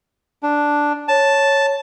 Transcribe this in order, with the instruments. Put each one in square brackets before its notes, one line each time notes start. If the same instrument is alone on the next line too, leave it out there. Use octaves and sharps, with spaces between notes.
[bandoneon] D4
[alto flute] C#5 [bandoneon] A5